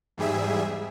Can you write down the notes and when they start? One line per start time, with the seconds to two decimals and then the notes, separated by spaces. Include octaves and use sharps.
0.18 E2 G#2 G3 G#4 E5